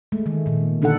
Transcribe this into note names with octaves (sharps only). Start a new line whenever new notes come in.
G#3 A3
D#3 A3
A#2 D#3
D3 D4 D#4 A4 F#5